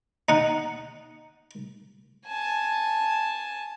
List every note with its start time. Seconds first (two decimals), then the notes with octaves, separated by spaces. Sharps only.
0.29 D#4 F#5
2.27 G#5 A5